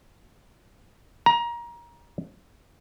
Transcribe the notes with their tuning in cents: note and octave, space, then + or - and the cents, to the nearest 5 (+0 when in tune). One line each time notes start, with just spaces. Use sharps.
A#5 +25